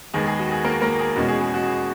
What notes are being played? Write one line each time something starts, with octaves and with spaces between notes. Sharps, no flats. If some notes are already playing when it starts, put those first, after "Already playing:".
D#2 D#3 G#3 B3 G#4
G#4
F#4
G#4
A#3 A#4
A#3 A#4
G#4
E2 B2 G#3 C#4 F#4
G#4
G#4
F#4
G#4